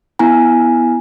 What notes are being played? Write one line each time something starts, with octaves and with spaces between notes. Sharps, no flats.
B3 E4 G#5 A#5